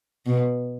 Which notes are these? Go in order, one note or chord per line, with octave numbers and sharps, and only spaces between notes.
B2